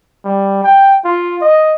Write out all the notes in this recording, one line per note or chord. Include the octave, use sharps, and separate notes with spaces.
G3
G5
F4
D#5